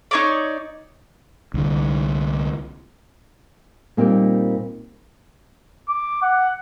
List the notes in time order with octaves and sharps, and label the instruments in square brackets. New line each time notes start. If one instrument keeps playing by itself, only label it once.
[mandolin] D#4 C#5 D5
[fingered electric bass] C2 D3
[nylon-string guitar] A#2 G3 A#3 C4 D#4
[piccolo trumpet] D6
F#5